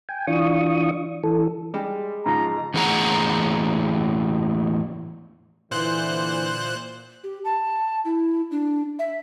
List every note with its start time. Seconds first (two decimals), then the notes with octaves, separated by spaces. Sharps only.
0.09 G5 G#5
0.27 E3 D4 F4 C#6 D#6
1.24 E3 A4
1.74 G3 G#3
2.26 G#2 C#3 F3 A#5
2.74 E2 A2 A#3 G#4 F#5 A#5
5.71 A#2 D3 E3 C5 F#6
7.24 G4
7.44 A5
8.05 E4
8.51 D4
8.99 E5